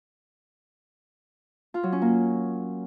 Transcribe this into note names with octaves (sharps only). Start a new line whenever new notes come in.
F4
F#3
C#4
A#3